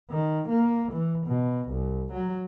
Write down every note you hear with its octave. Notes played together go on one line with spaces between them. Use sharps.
D#3
A#3
E3
B2
C2
F#3